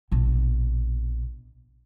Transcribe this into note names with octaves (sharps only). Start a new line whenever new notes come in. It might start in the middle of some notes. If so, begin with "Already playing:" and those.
A#1 B2